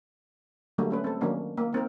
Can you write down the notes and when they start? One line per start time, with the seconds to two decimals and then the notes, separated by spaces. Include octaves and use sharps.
0.78 D3 F#3 G3 A3 A#3 D4
0.90 A3 C#4 B4
1.04 C4 A4
1.21 D#3 F#3 A#3 C#4 D4
1.57 A#3
1.73 A#3 C4 D#4 A#4